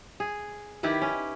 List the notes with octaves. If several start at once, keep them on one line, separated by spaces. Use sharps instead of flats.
G#4
D#3 E4 G4 B4
C#4